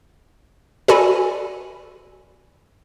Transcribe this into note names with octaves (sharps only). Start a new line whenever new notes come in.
F#4 A4 D5 G#5 B5